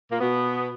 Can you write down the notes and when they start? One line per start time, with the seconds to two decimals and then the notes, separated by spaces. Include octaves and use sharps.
0.11 A#2 A#3
0.21 B2 B3